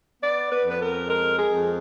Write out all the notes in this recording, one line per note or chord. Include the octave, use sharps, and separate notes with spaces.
B3 D5
B4
F2 B4
A#4
G#3 A#4
G#4
F2